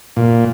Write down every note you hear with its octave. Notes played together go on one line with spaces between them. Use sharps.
A#2